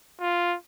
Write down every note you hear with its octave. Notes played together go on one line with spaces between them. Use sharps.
F4